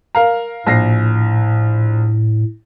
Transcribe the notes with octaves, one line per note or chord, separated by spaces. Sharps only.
A#4 F5 A#5
A#1 A2 A#6 C7